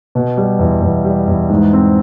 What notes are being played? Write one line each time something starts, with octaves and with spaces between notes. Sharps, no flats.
B2
G3
E2
E2
G3
E2
G#2
C4